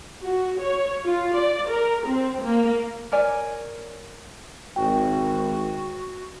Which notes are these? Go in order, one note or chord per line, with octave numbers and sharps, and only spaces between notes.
F#4
C#5
F4
D5
A#4
C4
A#3
A#4 C#5 D5 G#5
G#1 F#4 G5